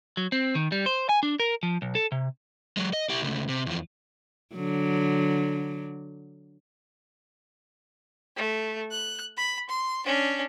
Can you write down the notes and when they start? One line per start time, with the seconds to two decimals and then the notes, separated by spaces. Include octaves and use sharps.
0.17 F#3
0.32 C4
0.55 D#3
0.72 G3
0.86 C5
1.09 G#5
1.23 D4
1.40 A#4
1.63 F3
1.82 B1
1.95 A4
2.12 C3
2.77 F#3 G#3
2.93 D#5
3.10 E4 G4
3.22 C#2 A3
3.49 C3
3.66 E2 F3
4.55 D3 F#3
8.36 A3
8.91 F#6
9.37 B5
9.70 C6
10.06 C#4 D4